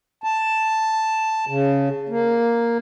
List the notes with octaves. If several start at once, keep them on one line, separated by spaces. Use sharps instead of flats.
A5
C#3
A#3